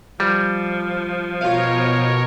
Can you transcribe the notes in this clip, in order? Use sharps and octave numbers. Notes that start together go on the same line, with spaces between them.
F3 G3
B2 F4 A#4 C#5 F5